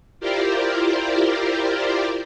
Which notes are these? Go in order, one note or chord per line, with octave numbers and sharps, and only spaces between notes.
E4 F4 G4 A#4 C5 D5